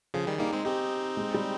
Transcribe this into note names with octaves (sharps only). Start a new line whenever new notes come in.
C#3 F3 G#4
D#3 G3
G3 A#3 D#4
G#3 C4
C4 D#4 G4
G#3
G3